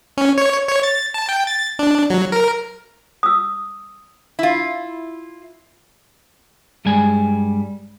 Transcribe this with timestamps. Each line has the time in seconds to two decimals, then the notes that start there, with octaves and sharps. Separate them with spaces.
0.17 C#4
0.38 C#5
0.68 C#5
0.83 A6
1.14 A5
1.29 G5
1.47 A6
1.79 D4
2.10 F#3
2.32 A#4
3.23 D#6 E6
4.39 E4 F4
6.85 G2 G3 G#3 G#5